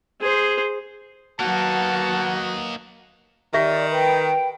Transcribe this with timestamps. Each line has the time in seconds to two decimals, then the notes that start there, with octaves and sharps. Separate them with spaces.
0.21 G#4 C5
1.40 F#3 A#3 B3 D#4 F#4 F#5 A5
3.54 D#3 G4 D5 E5
3.90 B4 G5